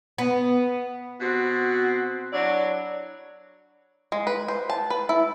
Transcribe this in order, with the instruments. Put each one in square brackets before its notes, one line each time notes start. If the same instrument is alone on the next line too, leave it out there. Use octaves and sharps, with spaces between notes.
[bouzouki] B3
[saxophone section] B2 C4 F#4
F#3 D4 E4 C#5 D5
[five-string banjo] G#3
B4
C5
A5
B4
E4